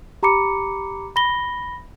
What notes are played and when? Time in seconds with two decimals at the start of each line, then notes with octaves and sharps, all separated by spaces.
0.23 G4 A#5 B5 D6 C#7
1.16 B5 A#6 G7